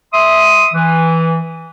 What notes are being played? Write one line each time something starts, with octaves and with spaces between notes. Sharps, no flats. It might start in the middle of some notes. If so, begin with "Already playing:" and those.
E5 C6 D#6
E3